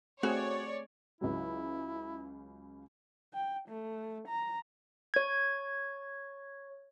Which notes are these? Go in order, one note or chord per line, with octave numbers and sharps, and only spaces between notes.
A3 C4 F#4 G#4 C#5 D5
C#2 C#3 F#3 E4
G5
A3
A#5
C#5 G#6